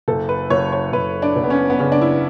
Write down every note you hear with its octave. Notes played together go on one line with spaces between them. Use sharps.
F#1 A4
B4
F#1 C#5
C#5
F#1 B4
D4
F#1
B3
C#4
B3
C#3 C#4
D4
E4